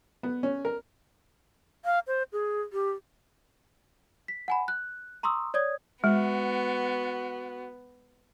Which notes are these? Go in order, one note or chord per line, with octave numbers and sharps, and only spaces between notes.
B3
C#4
A#4
F5
C5
G#4
G4
B6
F#5 G#5 B5
F#6
A#5 C6 C#6 D#6 E6
C#5 D5 D#6 G#6
G#3 B3 F#4